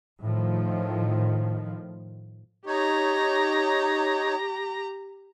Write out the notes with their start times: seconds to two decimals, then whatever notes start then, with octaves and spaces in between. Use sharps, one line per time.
0.20 A2 D#3 F3
2.66 D#4 G4 C#5 A#5